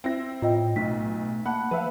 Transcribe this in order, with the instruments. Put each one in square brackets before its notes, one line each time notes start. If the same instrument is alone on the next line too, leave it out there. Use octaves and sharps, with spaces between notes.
[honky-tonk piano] C4 E4 A#6
[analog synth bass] A2 [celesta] F4 D#5 G5
[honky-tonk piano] B1 [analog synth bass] A3 [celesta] B6
[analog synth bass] A#3 [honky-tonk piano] F#5 F#6 [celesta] A5 B5
[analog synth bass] F3 [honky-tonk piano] B4 E5 F5